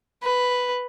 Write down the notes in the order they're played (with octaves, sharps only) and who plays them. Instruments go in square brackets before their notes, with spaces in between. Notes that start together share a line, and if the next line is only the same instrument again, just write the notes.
[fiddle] B4